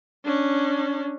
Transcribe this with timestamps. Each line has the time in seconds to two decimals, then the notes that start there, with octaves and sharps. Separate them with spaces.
0.25 C#4 D4